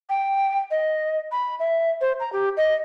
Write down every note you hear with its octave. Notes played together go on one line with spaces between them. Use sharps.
G5
D#5
B5
E5
C5
A#5
G4
D#5